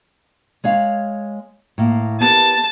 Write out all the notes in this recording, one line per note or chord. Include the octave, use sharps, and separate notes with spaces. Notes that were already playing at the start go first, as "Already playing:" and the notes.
G#3 C#5 F5
A2 A#3
B3 G4 A#4 A5